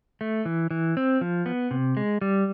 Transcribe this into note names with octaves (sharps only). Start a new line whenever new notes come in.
A3
E3
E3
C4
F3
B3
C3
G#3
G3